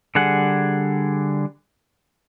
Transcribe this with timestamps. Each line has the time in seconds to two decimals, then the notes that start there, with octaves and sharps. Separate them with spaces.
0.15 D3 G3 G#4 F#5